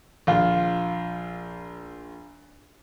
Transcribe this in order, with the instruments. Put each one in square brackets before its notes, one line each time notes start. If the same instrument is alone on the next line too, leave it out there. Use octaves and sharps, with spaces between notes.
[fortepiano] A#1 F4